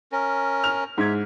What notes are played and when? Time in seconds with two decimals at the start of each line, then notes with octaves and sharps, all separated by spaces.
0.12 C#4 A#4
0.64 F6 F7
0.98 G#2 E5 G#6